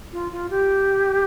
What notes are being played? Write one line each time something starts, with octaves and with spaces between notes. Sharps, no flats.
F4
F4
G4